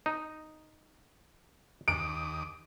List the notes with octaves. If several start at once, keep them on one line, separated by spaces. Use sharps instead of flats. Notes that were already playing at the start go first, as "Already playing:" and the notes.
D#4
D#2 D6 D#6 D7